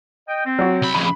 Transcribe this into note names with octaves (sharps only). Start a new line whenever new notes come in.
D#5 G5
C4
F#3 F#4
C2 B5
F2 C#3 B5